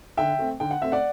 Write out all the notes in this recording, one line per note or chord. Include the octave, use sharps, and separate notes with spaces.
D3 E5 G5
A3 C4
D3 G5
F#5
A3 C4 E5
D5 F#5